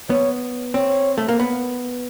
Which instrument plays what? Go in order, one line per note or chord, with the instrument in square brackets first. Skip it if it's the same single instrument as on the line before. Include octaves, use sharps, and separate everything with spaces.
[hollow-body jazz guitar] B3 [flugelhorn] C#5
[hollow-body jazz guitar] C4 [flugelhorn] C#5
[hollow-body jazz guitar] A3
A#3
B3